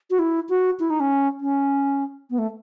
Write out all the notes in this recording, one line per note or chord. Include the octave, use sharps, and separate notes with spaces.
F#4
E4
F#4
E4
D#4
C#4
C#4
B3
A3